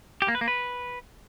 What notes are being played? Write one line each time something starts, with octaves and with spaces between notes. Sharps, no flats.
G4
A#3
B4
A#3
B4